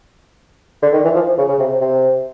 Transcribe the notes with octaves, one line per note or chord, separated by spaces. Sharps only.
D3
D#3
E3
F3
C#3
C#3
C3
C3